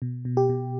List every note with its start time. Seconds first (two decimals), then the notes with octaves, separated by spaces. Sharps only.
0.02 B2
0.25 B2
0.37 G4
0.49 B2